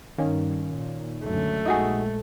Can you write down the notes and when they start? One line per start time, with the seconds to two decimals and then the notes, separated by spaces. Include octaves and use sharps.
0.18 G2 D#3 A#3 C#4
0.71 A#2
1.25 C#2 F#2 D3 A3
1.65 A#1 G#3 D#4 F#4 G#4